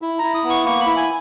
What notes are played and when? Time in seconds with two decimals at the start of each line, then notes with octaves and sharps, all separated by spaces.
0.02 E4
0.19 E4 A#5
0.34 D#6
0.44 B3
0.50 C#6
0.65 A#3 C#6
0.81 B5
0.87 E4
0.96 G#5